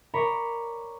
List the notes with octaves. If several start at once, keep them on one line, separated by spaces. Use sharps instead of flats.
A#4 C#5 D5 B5